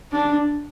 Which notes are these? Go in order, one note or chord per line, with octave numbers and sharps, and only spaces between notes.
D4